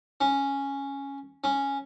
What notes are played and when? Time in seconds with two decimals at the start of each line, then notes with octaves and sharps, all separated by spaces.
0.21 C#4
1.44 C#4